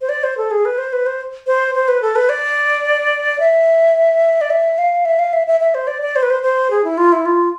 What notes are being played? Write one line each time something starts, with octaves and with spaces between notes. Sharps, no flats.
C5
D5
C5
A4
G#4
B4
C5
B4
C5
C5
C5
B4
A4
B4
D5
E5
D5
E5
F5
E5
F5
E5
E5
E5
C5
D5
D5
C5
B4
C5
C5
G#4
E4
F4
E4
F4